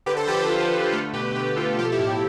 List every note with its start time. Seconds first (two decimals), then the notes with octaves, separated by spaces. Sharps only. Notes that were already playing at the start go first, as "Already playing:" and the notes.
0.06 D3 G4 B4
0.17 A4 C5
0.27 F3 G4 B4
0.39 G4 B4
0.49 D3 F4 A4
0.70 D3
0.92 A3 F4 A4
1.13 B2 G4 B4
1.35 B2 G4 B4
1.56 B2 F4 A4
1.78 F3 G4
1.85 A4
1.92 E4 G4
2.00 A2